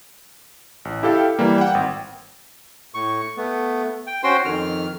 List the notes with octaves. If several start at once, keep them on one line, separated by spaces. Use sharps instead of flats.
A1
E4 G4 A4 F5 G5
E3 G3 A#3
F#5 G5
G#1
A2 C#6
A3 B3
G5
C#4 F#4 C5 G5 C6
F2 D#3 F6